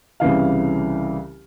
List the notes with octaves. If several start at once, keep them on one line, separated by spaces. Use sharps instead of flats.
C2 C#3 E3 F5